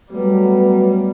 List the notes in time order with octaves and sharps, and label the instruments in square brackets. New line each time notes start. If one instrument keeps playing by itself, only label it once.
[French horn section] F#3 A3 B3 [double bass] G3